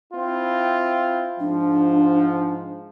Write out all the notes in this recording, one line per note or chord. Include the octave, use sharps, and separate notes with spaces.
C4 E4 F4
G#2 F3 D4